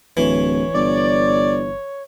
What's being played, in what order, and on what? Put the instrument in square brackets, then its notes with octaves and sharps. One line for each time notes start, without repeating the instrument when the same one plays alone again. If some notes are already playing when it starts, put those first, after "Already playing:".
[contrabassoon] D1 [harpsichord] E3 [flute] C#5
[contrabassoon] G1 [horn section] D5